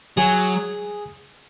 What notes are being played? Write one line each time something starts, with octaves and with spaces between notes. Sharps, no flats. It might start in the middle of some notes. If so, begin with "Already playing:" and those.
F#3 G#4